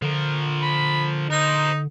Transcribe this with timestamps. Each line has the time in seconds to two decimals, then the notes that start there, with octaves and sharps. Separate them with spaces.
0.02 D3 F3 A#4
0.62 B5
1.30 D#4 A#4 C5